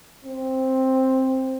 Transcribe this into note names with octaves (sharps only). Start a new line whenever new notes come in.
C4